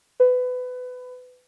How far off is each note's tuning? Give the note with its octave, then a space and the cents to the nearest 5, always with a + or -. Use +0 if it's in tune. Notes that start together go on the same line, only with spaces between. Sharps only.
B4 +25